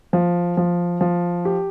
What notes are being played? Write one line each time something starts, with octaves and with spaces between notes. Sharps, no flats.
F3
F3
F3
G4